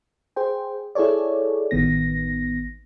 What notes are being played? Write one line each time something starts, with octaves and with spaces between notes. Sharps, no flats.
G#4 C5 G5
E4 G#4 A4 C#5 D5
A1 D#3 B3 A#6